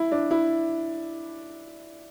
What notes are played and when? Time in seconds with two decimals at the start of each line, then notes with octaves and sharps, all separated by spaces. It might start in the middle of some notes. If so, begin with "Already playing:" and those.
Already playing: E4
0.12 D4
0.31 E4